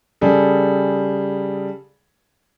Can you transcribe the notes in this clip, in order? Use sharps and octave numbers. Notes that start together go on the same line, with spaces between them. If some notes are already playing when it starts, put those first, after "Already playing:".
C#3 G3 G#4 A4